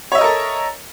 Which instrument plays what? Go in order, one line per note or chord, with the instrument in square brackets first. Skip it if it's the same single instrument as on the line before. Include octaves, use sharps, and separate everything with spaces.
[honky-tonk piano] C#5
E5
D#5
A#4
A4